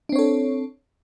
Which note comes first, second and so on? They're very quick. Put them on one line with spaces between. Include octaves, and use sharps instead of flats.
D4 C4 C#5 A4